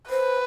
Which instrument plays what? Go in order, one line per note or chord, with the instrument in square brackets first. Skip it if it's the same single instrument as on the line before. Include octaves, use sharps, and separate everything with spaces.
[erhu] B4 [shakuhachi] C5